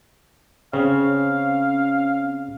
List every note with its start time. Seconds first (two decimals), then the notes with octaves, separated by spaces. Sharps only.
0.73 C#3 C4 C#4 F5